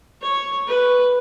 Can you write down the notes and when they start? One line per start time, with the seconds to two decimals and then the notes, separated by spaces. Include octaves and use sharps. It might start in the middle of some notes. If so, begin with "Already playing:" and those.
0.22 C#5
0.67 B4